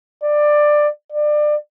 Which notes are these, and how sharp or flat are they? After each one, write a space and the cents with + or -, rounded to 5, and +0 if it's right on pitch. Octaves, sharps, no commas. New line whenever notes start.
D5 +15
D5 +25